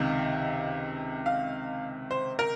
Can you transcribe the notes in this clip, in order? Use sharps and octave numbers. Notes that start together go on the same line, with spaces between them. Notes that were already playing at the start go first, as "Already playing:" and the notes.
Already playing: C#2 C3 D#3 F5
F5
C5
A#4